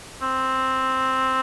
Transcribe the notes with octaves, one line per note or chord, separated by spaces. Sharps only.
C4